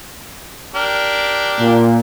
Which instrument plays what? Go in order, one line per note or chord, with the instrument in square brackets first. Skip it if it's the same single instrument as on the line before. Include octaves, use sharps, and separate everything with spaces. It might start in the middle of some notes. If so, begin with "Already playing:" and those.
[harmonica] D4 G4 A#4
[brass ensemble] A#2